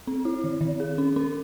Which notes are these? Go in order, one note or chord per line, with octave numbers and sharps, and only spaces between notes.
C4
E4
D#3
D#3
G#4
C#4
C#4